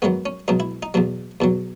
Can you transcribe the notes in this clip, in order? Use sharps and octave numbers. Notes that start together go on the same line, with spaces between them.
G#2 D#3 F#3 B3
C#4
C#2 B2 F#3 D#4
E4
D#4
E2 B2 F#3
E2 B2 F#3